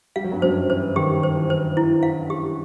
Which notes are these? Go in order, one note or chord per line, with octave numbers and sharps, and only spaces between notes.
G3 F5
F#3
G2 G3
F#2 F#3 C5
E3 C5
D#3 G4
C5
E3
C5
E4
F5
G4